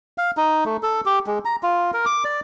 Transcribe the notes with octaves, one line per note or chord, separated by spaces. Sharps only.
F5
D#4
A3
A4
G4
G#3
A#5
F4
A#4
D6
D5